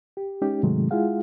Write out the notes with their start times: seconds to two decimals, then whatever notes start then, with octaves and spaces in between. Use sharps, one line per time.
0.17 G4
0.42 G#3 C#4 D#4 G4
0.63 G#2 C3 D#3 F#3 G#3 A3
0.91 G#3 E4 F4 G#4 F5 F#5